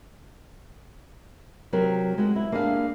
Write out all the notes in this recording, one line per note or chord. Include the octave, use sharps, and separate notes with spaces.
C3 F#3 F#4 G4 A#4
G#3 F#4
E4
A#3 D4 G4 G#4 F5